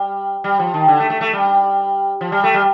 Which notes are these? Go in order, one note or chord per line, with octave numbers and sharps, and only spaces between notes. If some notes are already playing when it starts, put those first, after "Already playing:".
Already playing: G3
G3
F3
D#3
D3
A3
A3
A3
G3
F3
G3
A3
G3